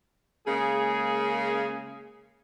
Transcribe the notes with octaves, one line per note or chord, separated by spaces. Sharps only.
C#3 G#3 A#3 G#4